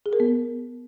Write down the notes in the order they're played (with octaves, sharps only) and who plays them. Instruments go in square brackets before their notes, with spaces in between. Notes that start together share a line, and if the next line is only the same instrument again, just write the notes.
[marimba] G#4
A#4
B3